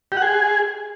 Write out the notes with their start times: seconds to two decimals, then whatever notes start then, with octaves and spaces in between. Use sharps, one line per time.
0.12 G4
0.17 F#5
0.22 G#4